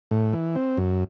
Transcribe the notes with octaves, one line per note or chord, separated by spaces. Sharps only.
A2
E3
C4
F#2